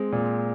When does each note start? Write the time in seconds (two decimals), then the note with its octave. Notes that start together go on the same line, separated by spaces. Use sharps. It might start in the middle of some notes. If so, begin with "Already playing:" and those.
Already playing: G#3 C4
0.12 A#2